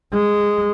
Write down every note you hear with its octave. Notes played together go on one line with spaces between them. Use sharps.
G#3